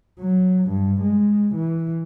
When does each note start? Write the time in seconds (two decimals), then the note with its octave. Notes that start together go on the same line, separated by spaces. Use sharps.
0.19 F#3
0.68 G2
1.01 G#3
1.55 E3